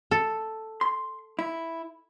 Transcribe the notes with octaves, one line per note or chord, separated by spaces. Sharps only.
A4
C6
E4